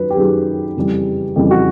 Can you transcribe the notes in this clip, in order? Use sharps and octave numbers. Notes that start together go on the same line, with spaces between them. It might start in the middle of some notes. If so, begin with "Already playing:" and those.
Already playing: F#2 D#3 F#3 B4
G4
F#2 D#3 F#3 G#4
F2 C#3 E3 G3
F2 C#3 E3 G3 G4
F#4